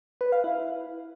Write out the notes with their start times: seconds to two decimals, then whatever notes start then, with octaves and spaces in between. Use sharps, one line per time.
0.21 B4
0.32 F5
0.44 E4